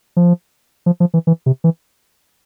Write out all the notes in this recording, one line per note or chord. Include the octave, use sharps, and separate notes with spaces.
F3
F3
F3
E3
E3
C3
E3